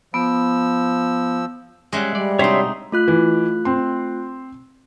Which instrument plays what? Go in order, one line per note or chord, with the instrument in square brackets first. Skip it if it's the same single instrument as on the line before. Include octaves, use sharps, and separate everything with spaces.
[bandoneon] F3 E6 [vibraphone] B3
[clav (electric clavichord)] G3 C#4 D#5 [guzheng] G#3 E5 F#5
[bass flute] G3 [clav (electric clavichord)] D5
[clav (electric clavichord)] C3 D4 F#4 [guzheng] C4 D#4 [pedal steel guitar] C#5 E5 C6
[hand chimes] A3 F4 F#6
[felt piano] E3
C4 C6